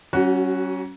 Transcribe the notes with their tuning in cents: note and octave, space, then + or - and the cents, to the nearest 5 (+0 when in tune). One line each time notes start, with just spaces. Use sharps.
F#3 +45 C#4 +0 F#4 +0